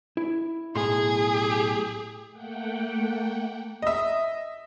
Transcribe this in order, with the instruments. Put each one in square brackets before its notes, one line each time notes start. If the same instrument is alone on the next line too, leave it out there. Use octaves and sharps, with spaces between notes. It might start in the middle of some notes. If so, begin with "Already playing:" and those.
[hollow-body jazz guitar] E4
[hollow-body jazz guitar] B1 A2 C6 [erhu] G#4
[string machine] A3 A#3 F#5 G5
[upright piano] D#5 E5